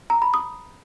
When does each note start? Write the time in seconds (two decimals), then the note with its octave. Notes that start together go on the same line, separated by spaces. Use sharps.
0.10 A#5
0.22 B5
0.34 D#6